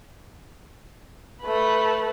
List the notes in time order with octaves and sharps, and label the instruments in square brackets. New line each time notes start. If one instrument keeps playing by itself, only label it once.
[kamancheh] A3 B4